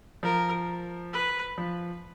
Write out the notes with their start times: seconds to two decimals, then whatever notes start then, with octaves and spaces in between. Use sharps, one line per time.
0.23 F3 A#4
1.13 B4
1.58 F3